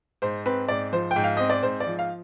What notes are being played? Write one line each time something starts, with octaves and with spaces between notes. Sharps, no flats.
G#2 C5
C4 B4
G#2 D5
F3 C5
G5
G#2
F5
C4 D#5
D5
G#2 C5
D5
F3
F5